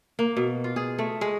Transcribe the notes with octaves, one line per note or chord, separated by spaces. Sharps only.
A#3
B2
F4
G#4
A3
G#3